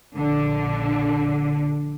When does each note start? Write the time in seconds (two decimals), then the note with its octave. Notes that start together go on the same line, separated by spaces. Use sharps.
0.16 A#1 D3